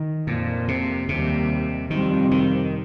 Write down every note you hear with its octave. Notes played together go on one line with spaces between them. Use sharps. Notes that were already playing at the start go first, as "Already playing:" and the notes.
Already playing: D#3
F2 A#2 F3 A#3
C3
D#2 C3 D#3 G3
F2 C3 D#3 G3 C4
D#3